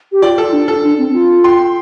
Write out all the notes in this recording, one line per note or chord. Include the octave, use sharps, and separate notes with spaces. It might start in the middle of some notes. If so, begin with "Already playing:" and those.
G4
F4 D5 G5
A4
F4
D4
A4
D4
C4
F4
G5 C6